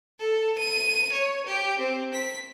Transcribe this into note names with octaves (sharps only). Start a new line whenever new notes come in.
A4
D#7
C#5
G4
C4
B6